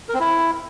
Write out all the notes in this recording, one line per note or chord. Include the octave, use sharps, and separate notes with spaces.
A#4
C4
E4